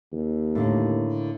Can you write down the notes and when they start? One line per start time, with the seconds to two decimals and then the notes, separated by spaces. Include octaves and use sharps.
0.12 D#2
0.55 A2 D3 A#3